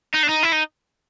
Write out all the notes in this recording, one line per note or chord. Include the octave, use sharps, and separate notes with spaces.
D#4
D4
D#4
E4
D#4